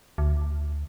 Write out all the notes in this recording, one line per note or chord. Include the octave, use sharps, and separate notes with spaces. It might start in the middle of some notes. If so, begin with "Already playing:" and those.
D2